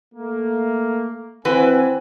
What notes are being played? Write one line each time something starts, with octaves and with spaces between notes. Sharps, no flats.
A3 A#3
E3 C4 F#4 B4 G#5